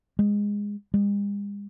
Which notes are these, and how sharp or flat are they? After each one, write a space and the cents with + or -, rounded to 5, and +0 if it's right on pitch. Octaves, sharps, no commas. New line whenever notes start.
G#3 -15
G#3 -45